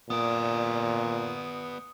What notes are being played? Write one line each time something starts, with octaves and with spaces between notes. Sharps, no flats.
A#2 B3 D5 D#6